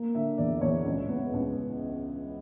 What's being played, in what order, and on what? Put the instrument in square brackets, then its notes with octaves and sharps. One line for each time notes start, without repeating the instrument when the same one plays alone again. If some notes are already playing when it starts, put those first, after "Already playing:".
Already playing: [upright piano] A#3
D3 E5
E2 D5
E2 C#5
C#2
B3
C#2